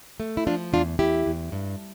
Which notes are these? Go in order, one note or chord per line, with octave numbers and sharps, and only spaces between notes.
A3
E4
F3 D4 F4
E2 D4 F4
E2 E4 G4
E2
G2